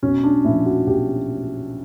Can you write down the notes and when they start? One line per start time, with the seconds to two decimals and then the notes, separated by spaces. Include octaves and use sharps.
0.03 B1 C#4
0.24 D4
0.45 A#2 F3 E4
0.65 F#4
0.86 B1 G4